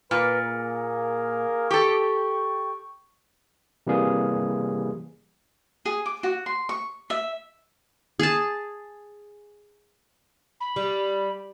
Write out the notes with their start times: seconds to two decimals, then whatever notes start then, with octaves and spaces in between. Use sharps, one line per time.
0.11 A#2 A#4 B4
0.45 A#3 G#4 A#4
1.71 G4 A4 G5 C#6
3.87 C3 E3 G3 A#3 G#4
5.85 G#4
6.06 D6
6.23 F#4
6.46 C6
6.69 C#6
7.10 E5
8.19 G#4 A5
10.60 B5
10.76 G3